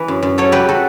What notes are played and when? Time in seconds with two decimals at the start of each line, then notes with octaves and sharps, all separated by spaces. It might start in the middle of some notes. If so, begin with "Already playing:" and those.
Already playing: E3 B4
0.08 F#2
0.23 F#2
0.38 F#3 A4 C#5
0.52 C#3 G4 B4
0.69 F#4 A4